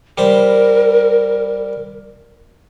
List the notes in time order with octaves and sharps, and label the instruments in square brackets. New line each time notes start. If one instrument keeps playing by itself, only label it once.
[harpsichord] G3 C5 B5 [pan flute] A#4